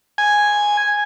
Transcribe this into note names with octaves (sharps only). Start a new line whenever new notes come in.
G#5